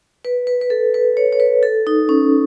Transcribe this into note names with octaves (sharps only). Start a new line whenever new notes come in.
B4
B4
B4
A4
B4
C#5
C#5
B4
A4
D#4
C#4